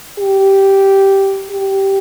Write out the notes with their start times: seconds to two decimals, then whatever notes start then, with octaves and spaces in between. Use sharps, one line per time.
0.19 G4
1.50 G4